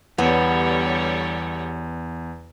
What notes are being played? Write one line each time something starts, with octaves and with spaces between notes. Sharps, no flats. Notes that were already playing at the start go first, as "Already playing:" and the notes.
E2 D3 G3 B3 C#5